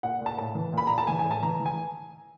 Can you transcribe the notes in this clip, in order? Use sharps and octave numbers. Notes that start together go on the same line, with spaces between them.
A#2 F#5
A#2
A5
A2 A5
E3
A#2
B5
A#2 A#5
A5
E3 G#5
G#5
A2
A5
E3 A#5
E3
G#5